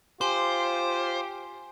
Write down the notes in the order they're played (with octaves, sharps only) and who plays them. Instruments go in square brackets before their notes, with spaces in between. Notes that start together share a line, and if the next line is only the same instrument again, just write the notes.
[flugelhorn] F4 [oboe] G4 [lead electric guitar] C5 [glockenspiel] G#5 C6